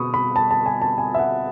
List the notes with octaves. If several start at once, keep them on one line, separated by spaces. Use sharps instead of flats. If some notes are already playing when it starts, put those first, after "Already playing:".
Already playing: B2 B5 C#6 D#6
B5
A5
A5
G#5
A5
G#5
E5
F#5